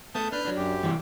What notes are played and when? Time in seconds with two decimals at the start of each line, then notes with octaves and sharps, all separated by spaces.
0.15 A3 B3 A5 D#6 G6
0.32 D4 B4 F6 G6
0.45 F#3 D4
0.57 F#2 G4
0.83 G2 E3 G5